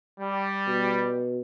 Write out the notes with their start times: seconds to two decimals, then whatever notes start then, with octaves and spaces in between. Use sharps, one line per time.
0.20 G3
0.67 B2